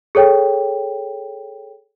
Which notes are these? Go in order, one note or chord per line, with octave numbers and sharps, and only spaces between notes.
G#4 A4 C#5 G5